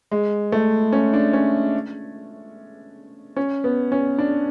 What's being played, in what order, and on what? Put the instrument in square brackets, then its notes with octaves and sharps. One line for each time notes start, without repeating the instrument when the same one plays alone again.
[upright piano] G#3
A3
C#4
D4
C#4
C#4
B3
C#4
D4